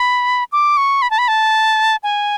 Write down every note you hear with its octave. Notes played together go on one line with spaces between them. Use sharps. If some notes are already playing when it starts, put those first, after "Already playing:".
Already playing: B5
D6
C#6
B5
A5
B5
A5
G#5